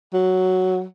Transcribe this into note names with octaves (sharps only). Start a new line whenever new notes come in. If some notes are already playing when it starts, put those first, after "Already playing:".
F#3